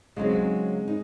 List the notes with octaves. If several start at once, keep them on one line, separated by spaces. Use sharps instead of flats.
C#3 F#3 G#3 C4 D#4
D#4